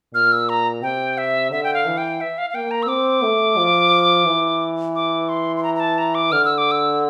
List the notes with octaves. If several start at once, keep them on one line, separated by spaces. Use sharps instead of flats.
A#2 F6
E6
A#5
C3 G5
E5
D3 E5
G5
F5
E3
G5
E5
F5
F5
A#3 G5
A#5
E6
C4 D6
A3
F3
E3
D6
C6
C6
A#5
A#5
A5
A#5
D6
D3 F6
E6
D6
E6